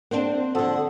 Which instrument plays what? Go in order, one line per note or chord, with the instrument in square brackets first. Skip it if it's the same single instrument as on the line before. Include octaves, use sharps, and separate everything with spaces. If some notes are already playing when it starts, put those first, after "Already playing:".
[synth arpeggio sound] A#3 C4 [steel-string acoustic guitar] D4 C5 F#5
[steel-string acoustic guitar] D3 F3 [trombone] A4 [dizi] F#5